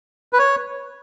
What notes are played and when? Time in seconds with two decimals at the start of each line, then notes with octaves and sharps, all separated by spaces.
0.33 B4
0.39 C#5